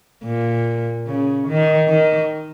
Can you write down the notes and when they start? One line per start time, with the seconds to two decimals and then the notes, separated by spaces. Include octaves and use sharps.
0.25 A#2
1.07 C#3
1.48 D#3
1.88 D#3